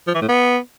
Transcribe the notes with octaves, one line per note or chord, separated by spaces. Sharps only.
F3
E3
A2
B3